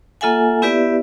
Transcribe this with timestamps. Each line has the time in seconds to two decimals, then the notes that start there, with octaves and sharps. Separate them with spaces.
0.21 A#3 F4 A4 E5 F#5 G#5
0.62 B3 E4 G4 B4 D5 E5